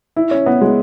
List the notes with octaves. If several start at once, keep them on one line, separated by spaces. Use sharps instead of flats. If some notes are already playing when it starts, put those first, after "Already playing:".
E4
C#4
B3
G#3